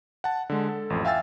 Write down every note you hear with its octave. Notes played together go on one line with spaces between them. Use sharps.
F#5 A5
D3 G#3
A4
A1 F2
E5 F5 G5 G#5 E6 A6